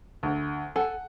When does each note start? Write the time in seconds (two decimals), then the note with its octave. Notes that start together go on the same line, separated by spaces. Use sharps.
0.23 D2
0.76 A4 F#5 G#5 A5